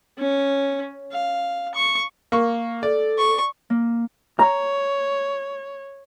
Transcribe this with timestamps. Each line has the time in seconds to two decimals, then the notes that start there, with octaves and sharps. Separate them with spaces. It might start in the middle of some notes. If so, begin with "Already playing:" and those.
0.18 C#4
1.12 F5
1.75 C#6
2.32 A#3 C#6
2.83 A4 D5
3.18 C#6
3.70 A#3
4.39 C#5 A#5